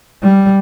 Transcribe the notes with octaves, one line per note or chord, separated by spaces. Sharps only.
G3